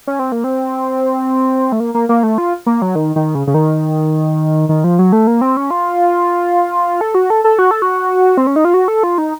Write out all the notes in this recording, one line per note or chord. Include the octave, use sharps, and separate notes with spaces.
C#4
C4
A#3
C4
A3
A#3
A#3
A#3
A3
F4
A#3
F#3
D#3
D#3
C#3
C#3
D#3
D#3
F3
F#3
A3
A#3
C4
C#4
F4
A4
F#4
A4
A4
F#4
A4
F#4
C4
C#4
D#4
F4
F#4
A4
F4
D#4